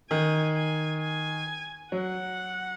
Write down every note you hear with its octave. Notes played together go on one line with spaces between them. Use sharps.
D#3 G#5
G#5
G#5
F#3 F#5